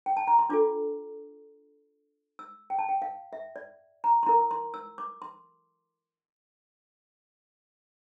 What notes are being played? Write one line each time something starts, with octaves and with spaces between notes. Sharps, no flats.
G5
A5
A#5
C6
D4 F4 A4 D6
E6
G5
A5
G5
F5
E5
D5
A#5
C6
E4 A#4 A#5
C6
E6
D6
C6